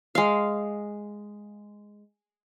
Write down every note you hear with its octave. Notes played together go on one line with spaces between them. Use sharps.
G#3 F5